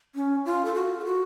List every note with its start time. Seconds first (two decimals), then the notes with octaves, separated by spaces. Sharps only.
0.15 C#4
0.45 F4
0.65 A4
0.74 F#4
0.99 A4
1.05 F#4